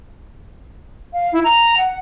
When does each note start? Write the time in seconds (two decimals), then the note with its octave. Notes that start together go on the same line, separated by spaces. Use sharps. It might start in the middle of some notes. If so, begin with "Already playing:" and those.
1.13 F5
1.33 E4
1.44 A#5
1.77 F#5